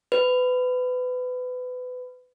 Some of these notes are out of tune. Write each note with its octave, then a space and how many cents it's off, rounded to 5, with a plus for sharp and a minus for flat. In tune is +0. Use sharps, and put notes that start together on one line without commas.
B4 +25